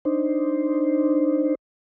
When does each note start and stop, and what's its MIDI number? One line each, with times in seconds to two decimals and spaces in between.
0.05 1.55 62
0.05 1.55 63
0.05 1.55 72